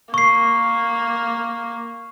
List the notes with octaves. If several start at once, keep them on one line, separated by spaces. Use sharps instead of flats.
A#3 C#6 C7